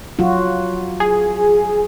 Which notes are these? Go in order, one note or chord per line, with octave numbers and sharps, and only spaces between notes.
F#3 F4 F#4
G#4